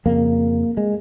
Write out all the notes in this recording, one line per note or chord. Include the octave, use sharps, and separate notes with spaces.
F2 C#3 A#3
G#3